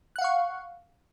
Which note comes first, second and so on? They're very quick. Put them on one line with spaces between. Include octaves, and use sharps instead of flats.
F#6 F#5 F5 C#6